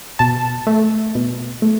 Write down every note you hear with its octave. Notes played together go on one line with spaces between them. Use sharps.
B2 A5
A3
B2
A3